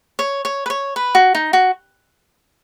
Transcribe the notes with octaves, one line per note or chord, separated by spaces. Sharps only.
C#5
C#5
B4
C#5
B4
F#4
D#4
F#4